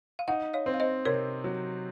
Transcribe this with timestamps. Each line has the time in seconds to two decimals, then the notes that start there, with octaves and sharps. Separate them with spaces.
0.19 F5
0.28 D#4 D#5 F#5
0.54 C#5 F5
0.66 C4
0.74 F5
0.80 C5 D#5
1.05 C3 A#4 C#5
1.44 F#3